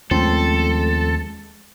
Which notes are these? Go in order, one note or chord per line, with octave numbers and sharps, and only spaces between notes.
D#2 F3 G#3 A3 C4 C#4 A4 C6